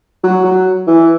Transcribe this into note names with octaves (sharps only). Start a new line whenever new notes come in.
F#3
F#3
E3